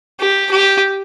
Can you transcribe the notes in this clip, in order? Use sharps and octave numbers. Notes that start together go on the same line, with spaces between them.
G4
G4